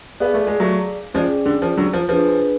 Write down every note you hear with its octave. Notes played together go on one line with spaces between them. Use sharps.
B3 G#4 D5 F5
A3
G#3
F#3 A3
F3 G#3 C#4 G#4 D5
D3
F3
D3 F#3
F3
F3 D4 G#4 B4